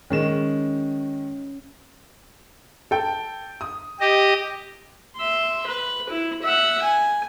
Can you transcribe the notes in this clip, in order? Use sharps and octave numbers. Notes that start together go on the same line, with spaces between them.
D#3 G#3 C#4 E7
A4 G5
D#6
G4 D#5
E5 C6
B4
E4
E5 F#5
G#5